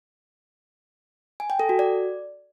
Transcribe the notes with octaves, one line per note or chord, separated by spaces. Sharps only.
G#5
G5
A4
F#4
D5